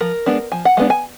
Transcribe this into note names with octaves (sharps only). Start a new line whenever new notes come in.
F3 A#4
G#3 B3 D4
F3 G#5
F#5
G#3 B3 D4 F5
G#5